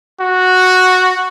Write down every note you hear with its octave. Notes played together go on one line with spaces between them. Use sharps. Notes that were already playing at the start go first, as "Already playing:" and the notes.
F#4